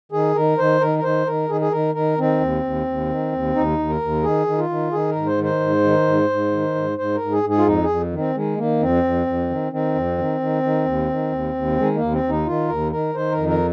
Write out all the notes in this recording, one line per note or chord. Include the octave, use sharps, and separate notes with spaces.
D#3 G#4
D#3 A#4
D#3 C5
D#3 A#4
A#4
D#3 C5
D#3 A#4
D#3 G#4
G#4
D#3 A#4
D#3 A#4
D#3 C4
D#2
D#2
D#2
D#3
D#2
D#2 D#4
D#2
A#4
D#2
D#3 G#4
D#3
F4
D#3
D#3 G#4
A#4
G#2
C5
D#3
C5
G#2
D#3
G#2
G#2
D#3
G#2
G#2 C5
A#4
G#2
G#4
G#2
G#4
F4
F2 D#4
G#4
F2
D#3
C4
D#3 G#3
D#3 A#3
F2 C4
F2
F2
D#3
D#3 C4
F2
D#3
D#3
D#3
D#2
D#3
D#2
D#2
D#3 G#3
A#3
D#2
C4
D#2
D#4
D#3 F4
D#2 A#4
D#3 A#4
D#3 C5
A#4
F2
A#4